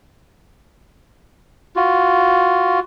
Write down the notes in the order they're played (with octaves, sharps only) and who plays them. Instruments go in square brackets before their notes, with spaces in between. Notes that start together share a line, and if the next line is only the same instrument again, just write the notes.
[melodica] F4 F#4